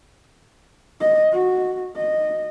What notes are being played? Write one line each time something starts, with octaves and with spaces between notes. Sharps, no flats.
D#5
F#4
D#5